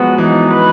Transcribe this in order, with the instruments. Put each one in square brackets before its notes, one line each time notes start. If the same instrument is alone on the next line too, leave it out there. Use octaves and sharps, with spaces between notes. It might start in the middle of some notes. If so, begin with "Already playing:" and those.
Already playing: [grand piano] F3 F#3 G#3 [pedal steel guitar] B3 F#4
[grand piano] E3 [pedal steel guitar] D#4
[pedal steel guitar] B4